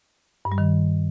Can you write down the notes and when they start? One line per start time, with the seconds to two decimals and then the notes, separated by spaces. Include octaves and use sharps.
0.45 G2
0.52 G3
0.58 D#3